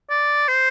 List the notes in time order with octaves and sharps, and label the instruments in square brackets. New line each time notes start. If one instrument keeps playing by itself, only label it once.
[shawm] D5
C5